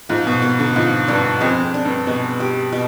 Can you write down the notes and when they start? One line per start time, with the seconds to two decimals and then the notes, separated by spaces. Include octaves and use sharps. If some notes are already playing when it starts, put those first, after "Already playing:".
0.09 G#2 F3
0.27 B2
0.42 B3
0.60 D3
0.76 G#2 F3
1.08 G2 D4
1.41 F2 G#3
1.63 F2
1.74 D4
1.85 G2
2.07 B2 G#3
2.40 G4
2.72 B2